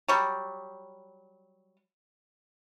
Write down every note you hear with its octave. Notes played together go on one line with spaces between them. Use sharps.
F#3 G3